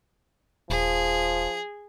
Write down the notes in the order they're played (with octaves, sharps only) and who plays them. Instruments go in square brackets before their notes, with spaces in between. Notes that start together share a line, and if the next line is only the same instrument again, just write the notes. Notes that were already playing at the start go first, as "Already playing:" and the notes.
[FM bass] D#1 [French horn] F3 [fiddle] G#4